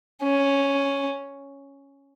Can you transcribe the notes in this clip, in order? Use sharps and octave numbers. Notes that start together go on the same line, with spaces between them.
C#4